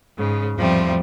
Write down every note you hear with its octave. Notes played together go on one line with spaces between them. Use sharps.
G#2 C#3
E2 A2 F3 G3 A3 C4